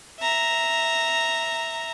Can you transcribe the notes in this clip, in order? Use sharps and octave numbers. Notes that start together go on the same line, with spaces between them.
E5 A#5